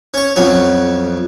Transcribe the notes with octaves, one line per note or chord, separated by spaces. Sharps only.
C#4 C#5
B1 F2 F#3 C#4